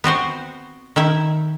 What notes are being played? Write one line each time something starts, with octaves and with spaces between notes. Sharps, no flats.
B3 C4 F#4 C5
D#3 E4 E5